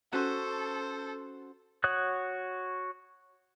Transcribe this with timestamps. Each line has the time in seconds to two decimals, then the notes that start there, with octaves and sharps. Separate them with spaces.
0.13 C#4 F#4 A4 C5
1.84 F#4 C#5 D#6 F#6